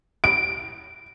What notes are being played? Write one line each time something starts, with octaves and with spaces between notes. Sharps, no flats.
D7